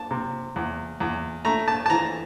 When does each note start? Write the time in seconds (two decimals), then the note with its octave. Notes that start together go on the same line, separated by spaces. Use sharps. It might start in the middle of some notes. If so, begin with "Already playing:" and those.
Already playing: A5
0.11 C3
0.56 E2
1.00 E2
1.45 A3 A#5
1.68 A5
1.86 A5
1.90 E3 A#5